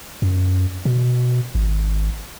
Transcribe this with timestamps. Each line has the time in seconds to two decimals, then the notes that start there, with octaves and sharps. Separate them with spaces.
0.22 F#2
0.85 B2
1.55 G#1